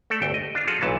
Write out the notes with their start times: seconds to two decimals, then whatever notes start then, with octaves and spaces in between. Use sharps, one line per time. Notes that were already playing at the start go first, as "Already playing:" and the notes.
0.10 A3 A4 D5
0.22 G1 D2 G5
0.34 D#5
0.55 D4 F4
0.67 F3 F4 F#4 G#4 A4
0.81 B1 A#2 E3 C#4 A5